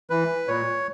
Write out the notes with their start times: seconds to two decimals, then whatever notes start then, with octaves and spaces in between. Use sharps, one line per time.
0.10 E3 B4
0.48 A#2 C#5